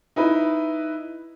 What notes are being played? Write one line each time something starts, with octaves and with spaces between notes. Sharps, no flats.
D#4 E4 B4